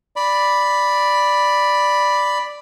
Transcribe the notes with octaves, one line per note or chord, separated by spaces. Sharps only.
D5 B5